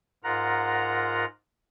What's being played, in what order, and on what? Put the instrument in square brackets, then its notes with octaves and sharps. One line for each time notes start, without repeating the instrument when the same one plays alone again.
[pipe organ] G#2 F4 A#4 F#5 A#5